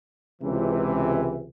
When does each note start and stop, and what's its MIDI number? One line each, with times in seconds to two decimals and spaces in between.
0.42 1.48 37
0.42 1.48 48
0.42 1.48 52